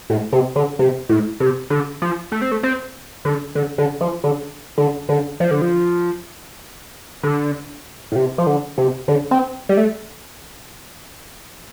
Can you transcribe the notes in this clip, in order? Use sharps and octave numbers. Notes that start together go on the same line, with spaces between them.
A2
C3
D3
C3
A2
C3
D3
F3
A3
C4
A3
C4
D3
D3
D3
F3
D3
D3
D3
F3
D3
F3
D3
A2
C3
F3
D3
C3
D3
C4
G3
A3